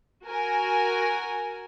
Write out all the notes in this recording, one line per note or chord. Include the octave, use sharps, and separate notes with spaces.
F#4 A#4 G#5